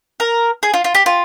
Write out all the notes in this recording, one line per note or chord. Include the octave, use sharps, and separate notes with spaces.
A#4
G#4
F4
F4
G4
F4